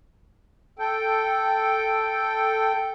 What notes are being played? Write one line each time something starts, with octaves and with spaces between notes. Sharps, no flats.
A4 G5